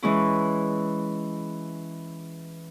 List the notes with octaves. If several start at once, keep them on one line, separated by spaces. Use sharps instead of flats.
E3 G#3 C#4 E4